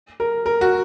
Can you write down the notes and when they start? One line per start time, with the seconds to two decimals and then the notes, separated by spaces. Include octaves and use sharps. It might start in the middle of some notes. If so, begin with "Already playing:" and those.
0.20 A#4
0.46 A#4
0.61 F#4